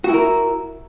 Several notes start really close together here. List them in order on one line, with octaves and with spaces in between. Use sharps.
F#4 E4 A#4